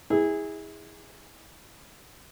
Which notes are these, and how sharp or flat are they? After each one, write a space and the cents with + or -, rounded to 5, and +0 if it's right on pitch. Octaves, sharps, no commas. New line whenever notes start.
E4 -30 G#4 -20